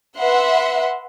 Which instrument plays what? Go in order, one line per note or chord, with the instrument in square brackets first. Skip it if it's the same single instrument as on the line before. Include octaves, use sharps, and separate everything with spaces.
[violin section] B4 E5 F#5 C6